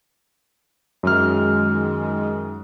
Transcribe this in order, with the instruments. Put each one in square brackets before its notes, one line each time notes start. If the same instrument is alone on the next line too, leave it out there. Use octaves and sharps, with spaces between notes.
[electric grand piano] F#2 F6 [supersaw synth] D#3 G#3